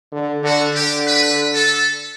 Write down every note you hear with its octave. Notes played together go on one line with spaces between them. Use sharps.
D3
D3 F#4
D3 G4
B4
A4